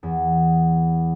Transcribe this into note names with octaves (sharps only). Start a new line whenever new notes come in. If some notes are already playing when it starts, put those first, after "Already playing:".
E2